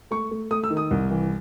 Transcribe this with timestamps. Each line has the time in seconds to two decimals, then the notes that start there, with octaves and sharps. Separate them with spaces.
0.11 A3 C#6
0.31 A3
0.51 A3 D#6
0.64 E6
0.70 D#3
0.77 D#6
0.91 C2
1.10 E3